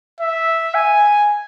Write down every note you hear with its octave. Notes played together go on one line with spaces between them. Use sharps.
E5
G#5